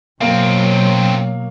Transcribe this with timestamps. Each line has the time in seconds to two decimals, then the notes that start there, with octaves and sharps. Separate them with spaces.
0.21 F#2 B2 F#3 A#3 C4 F5